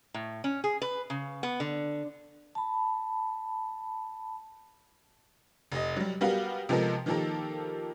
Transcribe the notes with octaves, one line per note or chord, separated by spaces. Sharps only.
A2
C#4
G#4
B4
C#3
B3
D3
A5 B5
F1 D#5
F#3 G3
G3 B3 F#4 G4 A#4 F5
C3 F3 G#3 B3 A4 A#4
D#3 F3 A#3 G4 A4 A#4